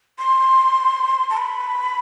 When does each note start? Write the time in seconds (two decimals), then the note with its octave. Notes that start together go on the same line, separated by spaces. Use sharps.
0.19 C6
1.30 A5
1.37 B5